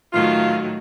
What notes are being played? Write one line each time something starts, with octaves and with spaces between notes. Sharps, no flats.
A2 D#3 F#3 F4